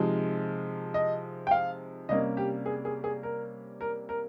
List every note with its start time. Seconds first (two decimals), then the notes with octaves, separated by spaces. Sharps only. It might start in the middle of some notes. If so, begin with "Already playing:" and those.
Already playing: C3 F3 G#3 D#4
0.94 D#5
1.47 G5
1.51 F5
2.09 C3 G3 A#3 C#4 D#5
2.37 G4
2.66 G#4
2.85 G#4
3.04 G#4
3.23 A#4
3.81 A#4
4.09 A#4